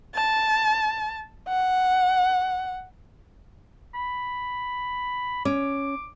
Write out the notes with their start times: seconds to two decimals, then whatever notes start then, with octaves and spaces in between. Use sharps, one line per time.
0.15 A5
1.48 F#5
3.94 B5
5.45 C#4 D6